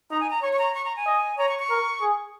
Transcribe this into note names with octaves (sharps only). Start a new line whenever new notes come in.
D#4 A#5
G#5
A#5
C#5 C#6
C#6
A#5
C#6
A#5
G#5
D#5
C#5 A#5
C#6
C#6
A#4
G#4